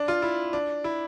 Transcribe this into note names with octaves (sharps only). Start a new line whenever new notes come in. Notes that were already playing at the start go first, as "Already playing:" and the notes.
Already playing: D4
F4
E4
D4
E4